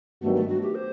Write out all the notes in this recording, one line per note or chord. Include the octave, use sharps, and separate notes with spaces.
G2 D#3 F#3 A3 B3 F#4
A3
F#4
G4
C5